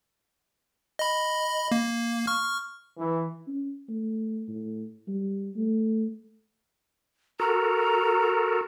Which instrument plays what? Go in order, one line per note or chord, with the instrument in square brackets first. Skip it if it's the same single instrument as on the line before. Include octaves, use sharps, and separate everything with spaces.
[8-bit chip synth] D#5 B5
A#3
C#6 F6
[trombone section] E3
[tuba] C#4
A3
A2
G3
A3
[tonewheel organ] F#4 A4 A#4 [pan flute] A#5